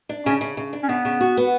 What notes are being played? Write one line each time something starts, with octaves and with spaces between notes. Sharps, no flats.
D4
C#3 C#4
C#3
C#3
D4
C#4
C#3 B3
C#3
F#4
B3